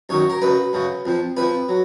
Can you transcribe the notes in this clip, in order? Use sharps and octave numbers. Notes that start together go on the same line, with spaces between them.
F#2 D#3 F#3 C#5
A#4
F#2 C#3 F#3 B4
F#2 C#3 F#3
F2 F3
F2 F3 B4
F#3